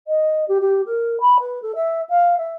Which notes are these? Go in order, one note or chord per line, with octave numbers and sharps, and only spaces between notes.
D#5
G4
G4
A#4
B5
B4
A4
E5
F5
E5